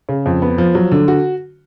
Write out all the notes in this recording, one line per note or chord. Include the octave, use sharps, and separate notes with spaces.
C#3
F2
B3
F3
F#3
D3
F#4